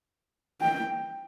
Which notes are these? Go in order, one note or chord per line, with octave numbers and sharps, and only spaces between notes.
G5